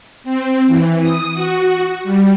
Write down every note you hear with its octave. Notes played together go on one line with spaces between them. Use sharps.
C4
E3
D#6
F#4
G3